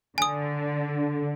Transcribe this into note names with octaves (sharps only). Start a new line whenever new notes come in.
D3 G#5 D#6